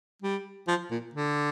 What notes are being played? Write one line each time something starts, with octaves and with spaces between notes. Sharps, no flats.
G3
F3
A#2
D3